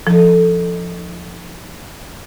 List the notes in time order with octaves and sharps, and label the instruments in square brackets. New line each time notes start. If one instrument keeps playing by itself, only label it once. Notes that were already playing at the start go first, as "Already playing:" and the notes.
[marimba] F3 [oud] D#4 A4